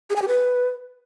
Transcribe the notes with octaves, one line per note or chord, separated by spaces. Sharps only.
G#4
G#5
G4
B4